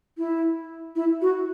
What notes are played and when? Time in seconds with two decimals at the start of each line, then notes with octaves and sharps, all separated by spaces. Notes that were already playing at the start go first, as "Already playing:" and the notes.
0.18 E4
0.96 E4
1.22 F#4